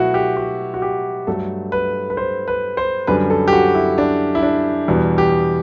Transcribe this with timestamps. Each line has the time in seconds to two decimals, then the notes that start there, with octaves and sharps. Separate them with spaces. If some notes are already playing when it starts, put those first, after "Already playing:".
Already playing: B2 F#3 A3 E4 F#4
0.14 G4
0.37 F#4
0.74 F#4
0.82 G4
1.27 G2 F#3 A3 A4
1.72 B4
2.10 B4
2.17 C5
2.48 B4
2.77 C5
3.07 F#2 D3 G3 B4
3.30 A4
3.48 G4
3.53 F#4
3.75 E4
3.98 D4
4.35 E4
4.43 D4
4.88 E2 B2 G3
5.18 G4